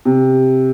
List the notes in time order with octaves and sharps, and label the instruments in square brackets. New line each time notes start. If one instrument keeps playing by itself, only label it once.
[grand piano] C3